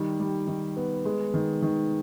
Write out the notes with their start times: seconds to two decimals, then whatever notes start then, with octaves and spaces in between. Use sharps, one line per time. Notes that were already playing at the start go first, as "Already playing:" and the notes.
Already playing: D#3 G3
0.20 G3
0.47 D#3
0.77 B3
1.05 G#3
1.34 D#3
1.62 D#3